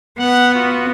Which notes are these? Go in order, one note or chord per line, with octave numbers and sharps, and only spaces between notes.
B3 F#5
F4 F#4